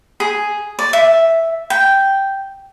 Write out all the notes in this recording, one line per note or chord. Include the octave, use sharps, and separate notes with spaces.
G#4
D5
E5
G5